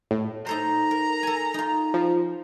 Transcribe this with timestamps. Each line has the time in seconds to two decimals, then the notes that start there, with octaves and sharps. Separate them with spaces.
0.11 A2
0.47 D#4 A4 C5 A#5
0.91 A#4
1.23 A4 G#5
1.54 D#4 F4
1.94 F3